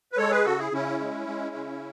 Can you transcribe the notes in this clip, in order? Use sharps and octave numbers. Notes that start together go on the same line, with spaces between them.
B4
G#3 A4 C#5
G#4 B4
C#3 F#4 A4
E4 G#4
C#3 C#4 E4
G#3
G#3
C#3